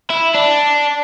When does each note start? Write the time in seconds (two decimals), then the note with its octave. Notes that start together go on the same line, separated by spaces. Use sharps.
0.10 E4
0.34 D4